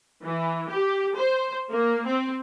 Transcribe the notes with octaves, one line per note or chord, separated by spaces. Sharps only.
E3
G4
C5
A#3
C4